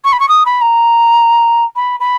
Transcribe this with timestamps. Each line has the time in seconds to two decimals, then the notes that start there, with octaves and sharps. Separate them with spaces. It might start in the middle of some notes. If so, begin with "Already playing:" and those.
0.05 C#6
0.13 B5
0.20 C#6
0.29 D#6
0.46 B5
0.61 A#5
1.76 B5
2.00 B5